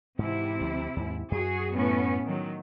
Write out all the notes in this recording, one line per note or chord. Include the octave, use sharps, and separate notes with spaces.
G#2 C3 E3 E4
D2 F3 C4
D#2 G#2
F#2 F#4 G#4
A2 B3 C#4
D#3 F#3